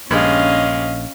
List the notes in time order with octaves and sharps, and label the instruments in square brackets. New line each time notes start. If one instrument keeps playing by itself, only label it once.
[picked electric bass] A#1 [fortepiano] G2 G#3 [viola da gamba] C#4 [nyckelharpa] D#5 F5